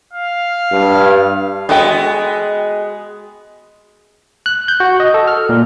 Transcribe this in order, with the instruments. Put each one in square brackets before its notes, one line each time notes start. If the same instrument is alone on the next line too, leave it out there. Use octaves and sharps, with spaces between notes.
[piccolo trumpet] F5
[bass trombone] G2
[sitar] G#3 B3 [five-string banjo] F#4 A4 G5
[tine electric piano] F#6
G6
F#4
D#5
A4
F6
A#2